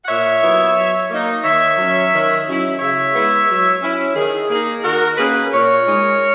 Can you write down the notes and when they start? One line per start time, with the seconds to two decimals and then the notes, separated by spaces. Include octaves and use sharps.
0.04 F#5
0.08 A#2 C#5 E5
0.41 F#3 B3 E4
0.76 F#3
1.10 A#3 D#4
1.43 D#3 C#5 E5
1.77 F#3 C#4
2.12 D#3
2.47 F#3 C#4 E4
2.79 C#3 C#5 E5
3.14 G#3 B3 E4
3.48 F#3
3.82 C#4 E4
4.15 D#3 G#4
4.49 A#3 D#4 G#4
4.84 D#3 F#4 A#4
5.17 A#3 C#4 G#4 B4
5.52 A#2 A#4 C#5
5.86 G#3 D#4